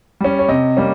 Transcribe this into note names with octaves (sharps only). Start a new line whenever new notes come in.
G3 C#4
C#5
C3 D#5
G3 A#3 C#4